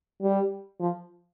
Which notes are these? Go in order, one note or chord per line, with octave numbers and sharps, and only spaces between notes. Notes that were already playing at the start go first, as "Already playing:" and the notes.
G3
F3